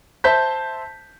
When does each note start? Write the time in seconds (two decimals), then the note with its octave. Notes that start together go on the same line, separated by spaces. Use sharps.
0.24 C5 E5 A5 G6 B6